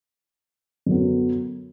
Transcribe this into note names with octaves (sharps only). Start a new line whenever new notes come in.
F#2 D3 F#3 B3